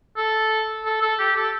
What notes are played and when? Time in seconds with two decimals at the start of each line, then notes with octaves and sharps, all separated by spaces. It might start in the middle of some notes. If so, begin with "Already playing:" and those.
0.17 A4
0.85 A4
1.02 A4
1.19 G4
1.36 A4